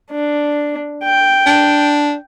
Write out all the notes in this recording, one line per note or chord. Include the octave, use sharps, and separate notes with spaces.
D4
G5
D4